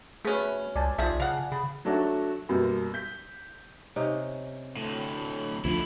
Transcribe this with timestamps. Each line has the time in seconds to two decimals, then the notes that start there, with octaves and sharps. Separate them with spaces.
0.25 B2 A3 C#4 G#4 B4
0.76 C#2 D5 G#5 A5
0.98 B1 C3 F3 F4 G#4 E5
1.20 C#3 F5 F#5
1.52 C#3 B5
1.85 F#3 A3 D4 F#4
2.49 F#2 B2 G3 A#3
2.94 G6 B6
3.96 C3 C#4 D#4
4.77 D2 A2
5.65 D2 D3 F3 E4